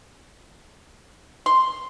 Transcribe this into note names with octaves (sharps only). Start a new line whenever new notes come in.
C6